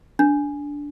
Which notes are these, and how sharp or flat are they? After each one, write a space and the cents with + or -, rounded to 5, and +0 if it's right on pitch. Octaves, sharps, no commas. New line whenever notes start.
D4 -15